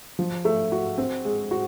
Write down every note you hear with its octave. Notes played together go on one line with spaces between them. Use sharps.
F3
A3
F#4
C4
G#3
F#4